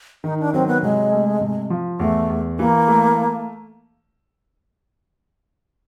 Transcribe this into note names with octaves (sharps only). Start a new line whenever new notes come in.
D#3 D#4
D4
F#3 C4
B3
C3 G#3
A3
C3
F3
E2 A3
E2
E3 A#3
A3